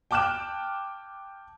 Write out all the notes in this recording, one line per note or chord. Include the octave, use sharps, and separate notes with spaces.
G5 A5 D6 F6 F#6 E7